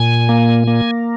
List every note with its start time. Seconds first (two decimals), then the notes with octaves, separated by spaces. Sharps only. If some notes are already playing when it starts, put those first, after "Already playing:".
Already playing: A#2 G#5
0.29 A#3
0.68 A#3